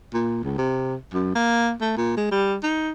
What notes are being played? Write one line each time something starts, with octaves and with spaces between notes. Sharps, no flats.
A#2
C#2
C3
F#2
A#3
A3
A#2
G#3
G3
D#4